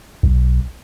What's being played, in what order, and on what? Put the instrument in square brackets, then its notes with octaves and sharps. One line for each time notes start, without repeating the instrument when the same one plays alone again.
[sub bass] B1